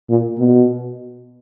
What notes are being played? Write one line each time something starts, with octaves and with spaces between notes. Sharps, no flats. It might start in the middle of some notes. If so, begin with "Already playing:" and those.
A#2
B2